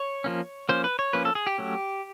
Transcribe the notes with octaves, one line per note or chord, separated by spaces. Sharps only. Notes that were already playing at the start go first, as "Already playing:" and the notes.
Already playing: C#5
F3 A#3 C#4
F3 A#3 C#4 C5
B4
C#5
F3 A#3 C#4 B4
A4
G#4
G4
F#3 A3 C#4